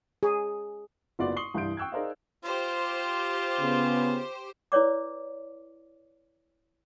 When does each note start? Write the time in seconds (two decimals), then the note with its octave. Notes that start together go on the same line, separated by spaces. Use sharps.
0.23 G#4
1.19 F#1 B3 F4 F#4 D5 C6
1.36 C6 C#6 D#6 C7 F#7 G7
1.54 C2 G2 E3 C6 G6 D7
1.77 G5 C#6 E6 F#6 G#6
1.92 D#4 G#4 A#4 C5 D5 F5
2.45 F4 G4 C5
3.60 C#3 B3
4.72 E4 B4 C#5 D5 D6